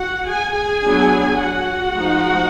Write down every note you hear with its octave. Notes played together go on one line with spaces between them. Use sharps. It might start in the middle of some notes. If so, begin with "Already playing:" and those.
Already playing: F#4 F#5
G#4 G#5
G#4 G#5
F#3 B3 D4
F#4 F#5
F3 G#3 D#4